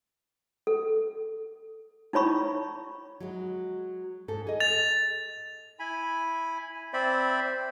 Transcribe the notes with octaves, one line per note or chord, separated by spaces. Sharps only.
A4
D#4 E4 C#5 B5 C#6
F#3 G#3
G#2 A4
G#4 D#5
A6 F7
E4 G#5 B5
C4 C5 D5 E5 B5